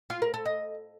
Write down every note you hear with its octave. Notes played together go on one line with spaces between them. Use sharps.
F4
A#4
A4
D#5